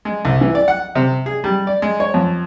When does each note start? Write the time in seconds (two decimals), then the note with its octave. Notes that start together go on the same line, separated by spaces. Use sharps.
0.05 G#3
0.25 C2
0.41 E3
0.55 D5
0.68 F#5
0.95 C3
1.26 G#4
1.44 G3
1.67 D5
1.82 G#3
2.00 C#5
2.14 F2